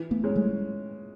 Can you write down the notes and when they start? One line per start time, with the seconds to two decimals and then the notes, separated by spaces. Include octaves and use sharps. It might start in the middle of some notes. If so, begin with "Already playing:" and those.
Already playing: E3
0.11 A3 B3
0.24 G#3 C#4
0.36 G3 A3